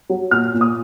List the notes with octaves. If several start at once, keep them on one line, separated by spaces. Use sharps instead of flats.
F#3
A#2 F6
A#2
D#6